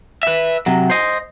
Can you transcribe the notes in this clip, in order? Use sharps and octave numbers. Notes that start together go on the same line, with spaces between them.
B4 E5
C3 F#3
C5 D#5